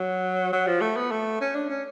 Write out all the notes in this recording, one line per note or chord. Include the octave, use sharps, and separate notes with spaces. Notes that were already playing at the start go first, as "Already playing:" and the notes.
Already playing: F#3
F#3
F3
A3
B3
A3
C#4
D4
C#4